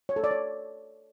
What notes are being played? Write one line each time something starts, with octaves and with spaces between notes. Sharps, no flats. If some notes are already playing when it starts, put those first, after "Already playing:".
C#5
A4
D5
C#5